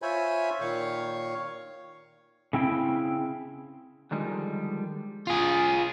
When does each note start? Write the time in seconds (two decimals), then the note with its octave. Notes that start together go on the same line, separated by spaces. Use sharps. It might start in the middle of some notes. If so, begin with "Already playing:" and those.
0.02 F4 C5 C#5 E5 G#5 B5
0.61 A#2 D#3 C#5 F5 C#6
2.53 C#3 C4 E4 G5
4.11 D3 D#3 F3 G3 G#3
5.27 F4 G#4